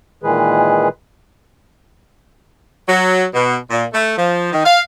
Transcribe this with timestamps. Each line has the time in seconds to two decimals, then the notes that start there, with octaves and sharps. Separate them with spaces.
0.23 A#2 D#3 E3 G#3 G#4 B4
2.87 F#3
3.34 B2
3.70 A#2
3.93 A3
4.17 F3
4.52 D#3
4.65 F5